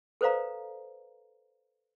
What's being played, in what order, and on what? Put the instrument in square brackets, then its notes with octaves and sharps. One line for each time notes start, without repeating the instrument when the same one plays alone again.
[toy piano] A4 B4 C5 D5 F5 A#5